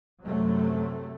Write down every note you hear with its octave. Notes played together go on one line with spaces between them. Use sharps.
F#2 C3 F#3 A3